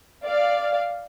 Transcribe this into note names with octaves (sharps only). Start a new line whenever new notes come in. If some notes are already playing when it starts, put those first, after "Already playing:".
D5 F5